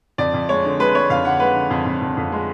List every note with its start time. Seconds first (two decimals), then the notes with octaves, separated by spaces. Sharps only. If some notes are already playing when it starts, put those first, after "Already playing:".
0.18 F2 D5
0.34 F2
0.49 G#3 C#5
0.65 D3
0.79 G#3 B4
0.95 G#3 C#5
1.10 F2 F5
1.25 D3 F#5
1.40 G#3 B4
1.55 D3
1.70 F2
1.86 F2
2.02 F2
2.17 F2
2.32 G#3